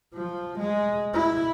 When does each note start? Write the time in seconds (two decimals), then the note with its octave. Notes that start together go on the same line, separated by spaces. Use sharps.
0.15 F3
0.59 G#3
1.14 E4